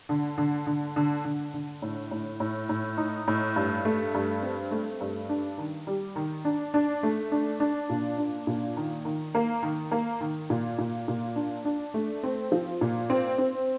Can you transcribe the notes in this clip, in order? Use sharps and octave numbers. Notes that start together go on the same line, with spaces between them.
D3
D3
D3
D3
D3
D3
A2
A2
A2
A2
D#4
A2
G2
A3
G2
C4
A3
G2
D4
D#3
G3
D#3
D4
D4
A3
D4
D4
A#2
D4
A#2
D#3
D#3
A#3
D#3
A#3
D#3
A#2
A#2
A#2
D4
D4
A3
C4
F3
A#2
C4
C4